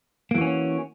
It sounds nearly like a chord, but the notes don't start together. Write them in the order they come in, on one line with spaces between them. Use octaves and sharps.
A#3 E3 F#4 C#4